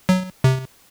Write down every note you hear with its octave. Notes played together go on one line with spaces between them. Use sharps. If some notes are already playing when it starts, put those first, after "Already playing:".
F#3
C3